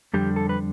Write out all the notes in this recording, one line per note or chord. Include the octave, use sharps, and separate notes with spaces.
F2 D3 G3 G4
A4
B4